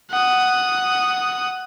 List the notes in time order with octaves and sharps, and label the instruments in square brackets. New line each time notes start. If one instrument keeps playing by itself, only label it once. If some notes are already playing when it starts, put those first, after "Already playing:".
[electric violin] F#5 D#6